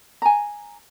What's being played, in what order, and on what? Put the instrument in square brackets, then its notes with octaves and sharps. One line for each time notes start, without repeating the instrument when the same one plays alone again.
[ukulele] G#5 A#5